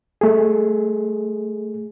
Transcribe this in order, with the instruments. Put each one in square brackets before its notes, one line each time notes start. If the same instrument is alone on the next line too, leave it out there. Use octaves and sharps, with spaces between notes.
[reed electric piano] A3 G#4